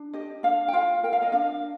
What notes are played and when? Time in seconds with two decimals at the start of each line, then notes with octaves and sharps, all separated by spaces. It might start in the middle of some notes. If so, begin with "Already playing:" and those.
Already playing: D4
0.13 G4 D#5
0.43 D4 F5
0.68 G5
0.73 F4 F5
1.03 A#4 G5
1.13 F5
1.22 D#5
1.32 D4 F5